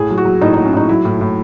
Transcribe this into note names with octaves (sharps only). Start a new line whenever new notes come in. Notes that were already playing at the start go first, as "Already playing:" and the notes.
Already playing: A2 G#4
F#3
F#4
F#3
A2 D#4
D#4
F#3
C#4
A2 D#4
F#3 E4
A2
A2